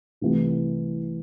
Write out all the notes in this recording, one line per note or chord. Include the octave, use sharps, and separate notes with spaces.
C2 C3 E3 A3